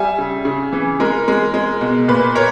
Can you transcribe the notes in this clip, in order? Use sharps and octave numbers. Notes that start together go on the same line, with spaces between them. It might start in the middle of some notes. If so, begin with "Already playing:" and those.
Already playing: G3 E5 G#5
C#3
C#3
E3
G#3 A#4
G#3
G#3
B2
A#2 B4
A#4 C#5